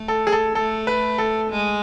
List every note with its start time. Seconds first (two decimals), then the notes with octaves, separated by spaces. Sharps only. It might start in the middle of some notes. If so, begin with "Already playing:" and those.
Already playing: A3
0.08 A4
0.27 G#4
0.32 A4
0.55 A3 A4
0.87 B4
1.18 A4
1.50 G#3